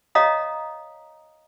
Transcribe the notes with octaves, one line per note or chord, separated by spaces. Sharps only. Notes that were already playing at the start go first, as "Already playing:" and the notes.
C#5 D#5 F5 A#5 D#6